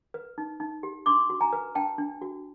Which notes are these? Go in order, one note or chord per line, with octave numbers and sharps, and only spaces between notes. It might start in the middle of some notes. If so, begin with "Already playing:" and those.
B4
D#4
D#4
G4
D4 C6 D6
F#4
G#5 A#5
B4
D4 G5 A5
D4
F#4